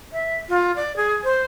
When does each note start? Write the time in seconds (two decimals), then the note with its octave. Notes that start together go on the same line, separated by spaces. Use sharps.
0.13 E5
0.49 F4
0.76 D5
0.97 G#4
1.24 C5